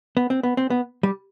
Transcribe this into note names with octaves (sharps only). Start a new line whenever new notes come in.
B3
C4
B3
C4
B3
G3